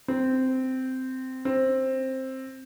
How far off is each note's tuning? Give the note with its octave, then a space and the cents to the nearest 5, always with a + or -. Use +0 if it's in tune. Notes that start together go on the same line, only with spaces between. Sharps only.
C4 -10
C4 +10